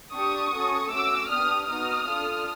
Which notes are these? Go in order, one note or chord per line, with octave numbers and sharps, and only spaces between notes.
D4 G4 C#6 D#6
C#4 F#4 A4
A3 C#4 F#4 D6 E6
B3 D4 G4 D#6 F6
B3 D#4 F#4 D#6 F6
D4 F4 A4